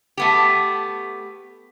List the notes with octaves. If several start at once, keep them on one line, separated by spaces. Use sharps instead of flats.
A3 B3 G4